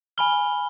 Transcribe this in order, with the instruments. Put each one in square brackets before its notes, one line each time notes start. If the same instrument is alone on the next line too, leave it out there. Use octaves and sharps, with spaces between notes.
[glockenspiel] G#5 B5 F6 G7